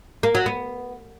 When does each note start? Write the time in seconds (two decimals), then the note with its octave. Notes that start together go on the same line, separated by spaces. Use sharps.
0.23 A#3
0.35 F#3
0.46 B3